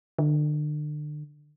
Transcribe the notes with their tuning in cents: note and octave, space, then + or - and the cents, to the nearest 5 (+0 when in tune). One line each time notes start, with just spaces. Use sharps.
D3 +35